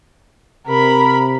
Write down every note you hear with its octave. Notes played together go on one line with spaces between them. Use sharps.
C3 A#4 B5